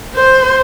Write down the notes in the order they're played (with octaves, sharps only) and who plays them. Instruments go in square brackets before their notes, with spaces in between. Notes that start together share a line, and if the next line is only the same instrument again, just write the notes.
[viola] C5